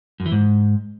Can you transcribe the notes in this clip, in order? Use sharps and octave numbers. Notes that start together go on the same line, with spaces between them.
F#2
E3
G#2